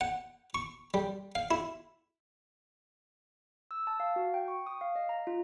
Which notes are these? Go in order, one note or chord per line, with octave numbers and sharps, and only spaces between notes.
F#5
C#6
G3
F5
E4
E6
A5
F5
F#4
G5
C#6
D#6
F5
D#5
A#5
F4